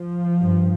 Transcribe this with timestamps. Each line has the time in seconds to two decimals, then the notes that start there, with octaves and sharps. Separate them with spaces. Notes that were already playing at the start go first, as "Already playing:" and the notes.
Already playing: F3
0.41 G2